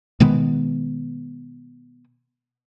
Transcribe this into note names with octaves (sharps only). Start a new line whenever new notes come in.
B2 D#3 G#3 B3